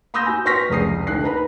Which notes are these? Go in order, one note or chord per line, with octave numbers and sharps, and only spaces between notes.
B5 C6 D#6 E6 G6 A#6
F#4 G#5
B4 C6 C#6 F6 A#6 B6
F1 C#2 D#6 C7
D2 A4 F#6 C7
D#4 B4 A#5 B5